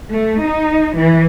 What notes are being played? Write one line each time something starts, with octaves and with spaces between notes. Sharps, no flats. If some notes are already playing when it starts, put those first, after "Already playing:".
A3
D#4
E3